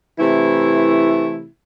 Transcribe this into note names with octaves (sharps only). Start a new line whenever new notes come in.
C3 E3 A3 E4